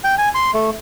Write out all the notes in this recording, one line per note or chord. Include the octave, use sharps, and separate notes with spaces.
G5
G#5
C6
A3